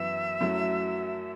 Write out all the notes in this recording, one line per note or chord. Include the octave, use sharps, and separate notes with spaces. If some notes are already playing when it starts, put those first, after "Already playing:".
Already playing: F#2 E3 B3 E4 E5
F#2 F#3 A3 E4